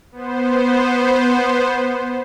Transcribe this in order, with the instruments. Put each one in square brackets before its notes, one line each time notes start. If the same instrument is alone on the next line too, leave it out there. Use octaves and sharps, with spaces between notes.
[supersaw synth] B3 C5